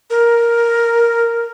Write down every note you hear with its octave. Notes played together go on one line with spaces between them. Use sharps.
A#4